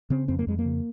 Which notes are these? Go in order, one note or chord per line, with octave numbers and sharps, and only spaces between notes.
C#3 C4
F2 C4
A#3
F2 G#3
A#3
C#3